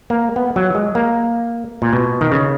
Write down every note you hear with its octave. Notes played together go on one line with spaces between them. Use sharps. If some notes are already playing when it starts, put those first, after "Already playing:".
A#3
B3
F#3
G#3
A#3
A#2
B2
D#3
C#3